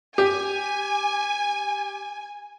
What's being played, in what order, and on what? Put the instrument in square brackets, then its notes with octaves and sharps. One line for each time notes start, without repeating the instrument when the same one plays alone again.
[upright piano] G4 [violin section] G#5